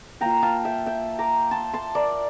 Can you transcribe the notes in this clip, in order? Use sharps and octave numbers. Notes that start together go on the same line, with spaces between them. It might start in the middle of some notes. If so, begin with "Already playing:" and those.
A#3 F4 G5 A#5
F5 A5
E5 G5
E5 G5
A#5 D6
A5 C6
A5 C6
A#4 D5